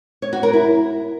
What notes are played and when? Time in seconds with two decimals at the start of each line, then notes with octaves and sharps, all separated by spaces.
0.22 C#5
0.33 F#4
0.43 A#4
0.53 E4